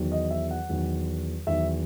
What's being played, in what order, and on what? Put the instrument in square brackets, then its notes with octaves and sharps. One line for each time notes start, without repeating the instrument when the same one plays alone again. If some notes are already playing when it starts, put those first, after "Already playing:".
Already playing: [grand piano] E2 D#3 F#3
D#5
E5
F#5
E2 D#3 F#3
E2 D#3 F#3 E5